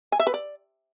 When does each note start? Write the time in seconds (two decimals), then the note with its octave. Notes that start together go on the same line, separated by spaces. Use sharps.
0.12 G#5
0.20 E5
0.27 B4
0.34 D5